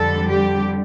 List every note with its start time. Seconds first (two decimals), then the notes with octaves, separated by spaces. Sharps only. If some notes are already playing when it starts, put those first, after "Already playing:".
Already playing: F2 D3 G3 A4
0.30 G4